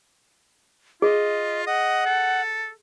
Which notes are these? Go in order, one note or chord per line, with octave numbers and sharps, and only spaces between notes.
F4 G#4 D#5
D#5 F#5
A4